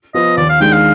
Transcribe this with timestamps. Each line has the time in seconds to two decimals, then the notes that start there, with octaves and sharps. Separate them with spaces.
0.15 F3 B3 F4 D#5
0.37 D#2 D5
0.49 F5
0.60 D#3 G#3 D4 G5
0.72 F5